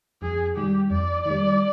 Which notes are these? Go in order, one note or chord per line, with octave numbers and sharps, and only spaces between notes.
F2 G#4
D#3 G3 G4
F2 D5
D#3 G3